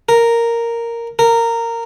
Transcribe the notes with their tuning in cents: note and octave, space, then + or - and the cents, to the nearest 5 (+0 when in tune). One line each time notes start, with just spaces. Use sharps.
A#4 -5
A#4 -15